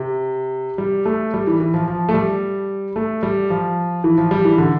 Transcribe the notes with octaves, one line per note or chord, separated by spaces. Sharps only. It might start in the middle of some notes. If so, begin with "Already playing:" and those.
Already playing: C3
G3
A3
G3
E3
E3
F3
F3
A3
G3
A3
G3
F3
E3
F3
G3
E3
D3